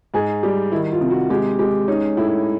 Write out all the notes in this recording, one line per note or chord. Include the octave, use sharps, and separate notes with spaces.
G#2 G#4
G3 G4
D#3 E4
F4
C3
F#4
G#3 G4
G#3 G4
C#4 D#4
A2 E4